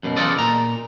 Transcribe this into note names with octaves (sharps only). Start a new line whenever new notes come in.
F#2 B2
E2 C#3 F4 A4 D5 D#5
A#2 A#5